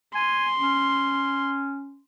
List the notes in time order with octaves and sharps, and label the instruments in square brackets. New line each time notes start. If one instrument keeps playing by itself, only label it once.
[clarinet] G#5 [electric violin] C6
[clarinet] C#4